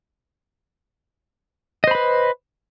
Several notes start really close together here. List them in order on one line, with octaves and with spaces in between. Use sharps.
D#5 C5 B5 B4